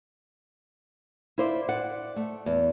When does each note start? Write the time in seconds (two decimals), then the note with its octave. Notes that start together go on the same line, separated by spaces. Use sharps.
1.38 E4 F4 C5 D5 E5
1.69 D5 F#5
2.16 A3
2.46 E2